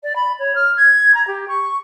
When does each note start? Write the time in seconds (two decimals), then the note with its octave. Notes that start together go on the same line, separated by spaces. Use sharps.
0.03 D5
0.15 B5
0.38 C#5
0.55 F6
0.76 G#6
1.14 A#5
1.27 G4
1.48 C#6